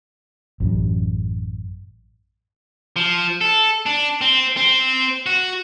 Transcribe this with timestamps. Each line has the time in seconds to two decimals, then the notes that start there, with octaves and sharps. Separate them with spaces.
0.60 A1 F#2
2.96 F3
3.41 A4
3.86 D4
4.21 C4
4.57 C4
5.26 F#4